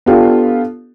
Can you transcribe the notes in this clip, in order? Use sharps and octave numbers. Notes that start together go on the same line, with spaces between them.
B3 D4 F4 G4 A4